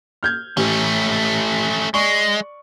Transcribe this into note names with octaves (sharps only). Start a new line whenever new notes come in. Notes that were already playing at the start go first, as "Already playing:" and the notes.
F6 G6 G#6
A1 A3 C#4
G#3 D5 C#6